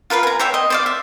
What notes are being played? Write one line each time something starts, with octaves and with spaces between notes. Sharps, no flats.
F4 A#4 B4 F5
G#5 A#5
C5 C#5 E5 G5
D#5
C5 D5 F5
E5